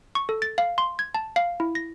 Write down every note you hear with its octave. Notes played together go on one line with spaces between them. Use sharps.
C#6
A4
A6
F5
C6
G#6
A5
F5
E4
A#6